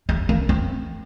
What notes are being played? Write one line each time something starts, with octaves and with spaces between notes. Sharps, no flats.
G3
A#3
C4